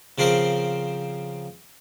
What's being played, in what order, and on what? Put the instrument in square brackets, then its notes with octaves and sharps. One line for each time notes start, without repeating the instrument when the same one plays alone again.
[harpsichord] C#3 F3 C4 A#4 C5